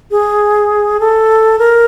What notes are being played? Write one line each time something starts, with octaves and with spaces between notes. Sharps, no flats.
G#4
A4
A#4